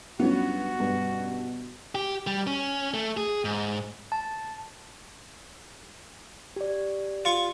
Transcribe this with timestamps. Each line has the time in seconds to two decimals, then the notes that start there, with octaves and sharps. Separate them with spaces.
0.19 G2 F#3 B3 C#4 F4 F#4
0.80 G2 B2 B4
1.95 G4
2.27 G3
2.47 C#4
2.94 A3
3.17 G#4
3.45 G#2
4.12 A5
6.56 G4 D5
7.25 F4 C#6